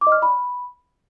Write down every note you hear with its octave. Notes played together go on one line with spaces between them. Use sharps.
D6
D#5
F6
D5
B5